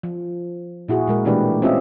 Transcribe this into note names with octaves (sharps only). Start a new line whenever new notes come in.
F3
A#2 E4 F#4 G#4
A#2 G#3 A#4
B2 E3 A3 D4 G4 B4
C4 C#4 F4 G4 D#5 E5